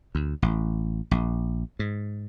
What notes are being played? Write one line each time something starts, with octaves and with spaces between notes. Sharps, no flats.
D2
A1
A#1
G#2